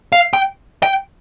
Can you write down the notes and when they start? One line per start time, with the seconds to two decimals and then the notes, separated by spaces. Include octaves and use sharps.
0.12 F5
0.33 G5
0.83 G5